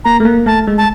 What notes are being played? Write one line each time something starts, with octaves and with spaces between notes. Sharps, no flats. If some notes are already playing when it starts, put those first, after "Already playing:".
A#3 A#5
A3
A#3
A3 A5
G#3
A5